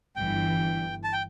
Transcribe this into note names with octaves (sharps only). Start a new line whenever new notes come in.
G1 G2 E3 G5
A5
G5